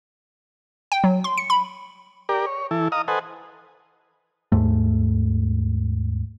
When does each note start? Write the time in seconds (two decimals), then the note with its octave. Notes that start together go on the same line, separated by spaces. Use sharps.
0.92 G5
1.04 F#3
1.24 C6
1.38 C#7
1.50 B5
2.29 G4 A#4 D5
2.46 C#5
2.71 E3 E4 A4
2.92 D#5 F5 A#5 D#6
3.08 A4 B4 C5 D#5 F#5 G#5
4.52 D#2 G#2 A3